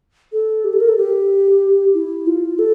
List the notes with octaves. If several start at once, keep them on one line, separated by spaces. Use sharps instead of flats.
A4
G4
A4
A#4
A4
G4
E4
F4
A4